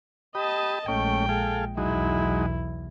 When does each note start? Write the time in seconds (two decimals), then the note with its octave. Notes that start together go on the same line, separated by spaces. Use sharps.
0.35 G4 D#5 A5 B5 D#6
0.88 A#1 G#3 A3 C#4 G5
1.29 G#4 A4 F5
1.77 B1 E2 F#3 G#3 D#4 E4